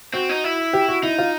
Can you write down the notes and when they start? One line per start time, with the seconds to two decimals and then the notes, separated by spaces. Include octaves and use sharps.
0.14 C4 F#4
0.29 D#4
0.44 E4
0.73 G4
0.88 F#4
1.03 D#4 E4
1.18 F4